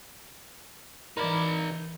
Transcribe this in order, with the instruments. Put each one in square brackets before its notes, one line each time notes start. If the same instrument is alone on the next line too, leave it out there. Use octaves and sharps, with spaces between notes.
[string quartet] E3 [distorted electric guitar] D#4 B5 [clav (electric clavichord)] A#4 D5